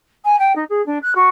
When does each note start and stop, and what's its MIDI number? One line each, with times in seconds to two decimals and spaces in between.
0.24 0.38 80
0.39 0.52 79
0.55 0.64 63
0.69 0.84 68
0.86 0.98 62
1.02 1.12 90
1.15 1.29 66